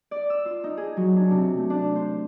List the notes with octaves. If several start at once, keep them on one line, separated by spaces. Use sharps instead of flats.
D5
E6
F4
D#4
G#4
F#3
D4
C3
A3
D4
C5